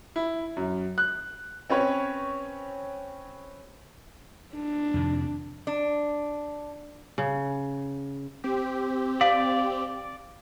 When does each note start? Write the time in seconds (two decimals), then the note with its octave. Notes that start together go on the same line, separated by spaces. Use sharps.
0.16 E4
0.57 F#2
0.98 F#6
1.70 C4 C#4 B4 C#5
4.54 D4
4.94 F2 C3 D#3
5.67 D4
7.18 C#3
8.44 C4 G4
9.21 D5 F5